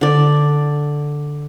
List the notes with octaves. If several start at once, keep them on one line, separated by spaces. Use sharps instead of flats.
D3 D5